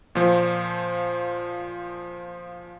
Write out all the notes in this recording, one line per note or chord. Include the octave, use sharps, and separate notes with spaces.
A#2 F3